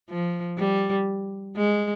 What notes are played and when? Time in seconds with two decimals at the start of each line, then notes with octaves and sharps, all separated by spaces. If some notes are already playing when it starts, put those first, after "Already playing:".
0.10 F3
0.58 G3
1.57 G#3